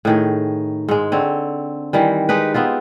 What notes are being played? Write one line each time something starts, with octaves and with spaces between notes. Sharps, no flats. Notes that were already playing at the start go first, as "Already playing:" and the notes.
A2 D#3 G#4
G#2 G#3
D3 C4 C#5
D#3 E3 G3
G#3 D#4 G4 B4
B3 C4 D#4 F4